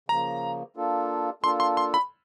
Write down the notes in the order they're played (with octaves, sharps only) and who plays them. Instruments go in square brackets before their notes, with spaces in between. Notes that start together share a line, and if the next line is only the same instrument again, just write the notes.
[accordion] C#3 F3 A#3 [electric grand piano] A#5
[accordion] A#3 D4 F4 A4
[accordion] A#3 D4 F4 A4 [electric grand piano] C6
[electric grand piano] C6
C6
B5